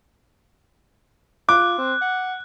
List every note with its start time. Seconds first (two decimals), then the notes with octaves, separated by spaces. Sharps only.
1.49 F4 D6 F#6
1.78 C4
2.01 F#5